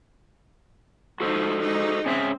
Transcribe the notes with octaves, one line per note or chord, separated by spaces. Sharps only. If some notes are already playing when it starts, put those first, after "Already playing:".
F3 G#3 D#4 F#4 A4 C5
G#3 D#4
C4 C#4 G#4 E5